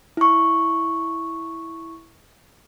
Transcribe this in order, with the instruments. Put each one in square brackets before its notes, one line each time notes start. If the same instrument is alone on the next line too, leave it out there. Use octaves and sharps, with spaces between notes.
[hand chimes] E4 C#6